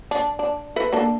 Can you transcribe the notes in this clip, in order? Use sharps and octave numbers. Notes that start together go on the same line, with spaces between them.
D4
D4
A4 B4 E5
A#3 D4 A4